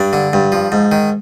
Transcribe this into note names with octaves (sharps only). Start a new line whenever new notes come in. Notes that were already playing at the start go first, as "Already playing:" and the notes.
Already playing: G2 D4
D3
G2
F3
G#2
D#3